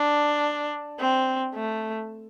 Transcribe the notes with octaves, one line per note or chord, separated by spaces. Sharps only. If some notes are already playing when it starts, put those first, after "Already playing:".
Already playing: D4
C4
A3